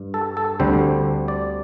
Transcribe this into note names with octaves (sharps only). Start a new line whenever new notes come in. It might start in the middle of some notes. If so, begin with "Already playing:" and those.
Already playing: G2
A4
A4
D2 D3 G3 C4 C5
D5